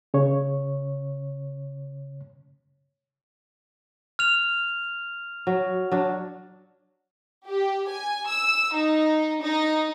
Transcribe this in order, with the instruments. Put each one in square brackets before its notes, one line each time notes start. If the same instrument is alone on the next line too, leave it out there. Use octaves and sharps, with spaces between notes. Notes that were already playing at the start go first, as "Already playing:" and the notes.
[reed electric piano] C#3 C#5
[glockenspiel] F6 F7
[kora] F#3
F#3 D4
[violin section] G4
G#5
E6
D#4
D#4